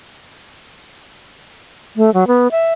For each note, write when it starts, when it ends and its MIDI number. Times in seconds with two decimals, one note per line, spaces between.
1.97 2.13 57
2.14 2.27 54
2.27 2.48 59
2.51 2.73 76